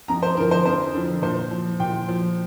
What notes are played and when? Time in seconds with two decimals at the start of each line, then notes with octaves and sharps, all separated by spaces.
0.08 F2 A#5
0.23 C5
0.37 D3 F3 A#4
0.51 C5
0.66 F2 C5
0.94 D3 F3
1.22 A#2 C5
1.51 F3
1.80 A#2 G5
2.08 F3